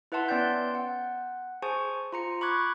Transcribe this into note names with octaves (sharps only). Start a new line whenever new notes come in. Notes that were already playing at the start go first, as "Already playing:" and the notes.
E4 B4 E5 F#5 A5 C6
B3 C#4 D5 G5 C6 G6
F#5
G#4 C5 G#5 A5 C#6
F4 A#5 C#7
B5 C#6 D6 F#6 G#6